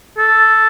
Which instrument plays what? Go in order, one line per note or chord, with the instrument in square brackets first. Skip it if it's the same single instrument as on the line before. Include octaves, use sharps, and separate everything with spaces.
[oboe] A4